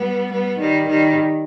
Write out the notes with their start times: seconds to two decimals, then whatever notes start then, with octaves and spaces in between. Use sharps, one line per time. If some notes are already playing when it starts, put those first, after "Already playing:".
Already playing: G3 B3
0.31 G3 B3
0.59 D#3 G3
0.87 D#3 G3